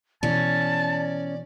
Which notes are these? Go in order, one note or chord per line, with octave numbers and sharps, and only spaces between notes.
B2 E3 C#4 D5 A5